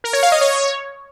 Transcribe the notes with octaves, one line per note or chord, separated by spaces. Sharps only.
A#4
C#5
F5
D#5
C#5